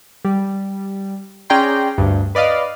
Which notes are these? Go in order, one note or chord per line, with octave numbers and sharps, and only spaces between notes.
G3
C#4 G#4 D5 G5 A#5 C6
D2 G2
B4 D5 D#5 F5